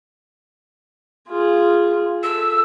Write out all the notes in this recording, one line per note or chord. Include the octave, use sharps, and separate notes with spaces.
F4 G#4
A4 E6